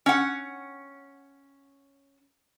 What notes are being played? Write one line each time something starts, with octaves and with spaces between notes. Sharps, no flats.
C#4 F#5